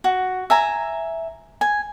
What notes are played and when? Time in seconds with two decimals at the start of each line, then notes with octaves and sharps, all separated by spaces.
0.04 F#4
0.50 E5 G#5 A#5
1.61 G#5